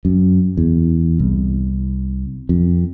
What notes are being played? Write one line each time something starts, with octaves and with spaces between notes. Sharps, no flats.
F#2
E2
C2
F2